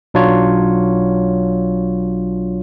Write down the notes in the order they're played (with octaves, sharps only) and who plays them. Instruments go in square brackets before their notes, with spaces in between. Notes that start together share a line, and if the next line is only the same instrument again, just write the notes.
[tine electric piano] B1 F#3 D4 F4 C#5